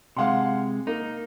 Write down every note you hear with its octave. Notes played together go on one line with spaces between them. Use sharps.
C3 G#3 F5 F#5 C6
A#3 D#4